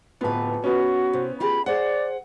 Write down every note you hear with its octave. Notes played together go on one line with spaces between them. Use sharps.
D1 B3 F4 B4
B3 C#4 F#4
C3
F4 G4 G#4 B5
G#4 C5 D5 F#5